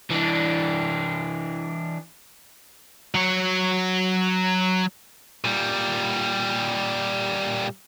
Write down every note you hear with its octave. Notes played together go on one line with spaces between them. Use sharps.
E3 D4
F#3 C#5
A#2 G3